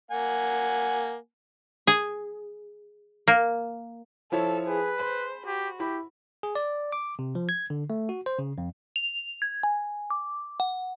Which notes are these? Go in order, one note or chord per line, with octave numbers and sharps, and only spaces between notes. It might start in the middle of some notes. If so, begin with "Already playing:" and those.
A#3 F#5 G#5
G#4
A#3
F3 E4 A4 C#5
G#4 B4
C5 B5
F#4 G4
E4 G4 B5
G#4
D5
D6
C3
F3
G#6
D3
A3
F#4
C5
C#3
F2
F7
G#6
G#5
D6
F#5